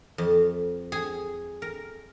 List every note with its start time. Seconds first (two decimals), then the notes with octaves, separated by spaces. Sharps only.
0.18 F2
0.92 G#4
1.62 A#4